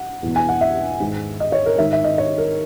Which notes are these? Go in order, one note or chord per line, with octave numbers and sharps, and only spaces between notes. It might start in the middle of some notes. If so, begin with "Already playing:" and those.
Already playing: F#5
E2 B2
G#5
F#5
E5
G#2 D#3
D#5
C#5
A#4
G#2 D#3 E5
E5
D#5
C#5
A#4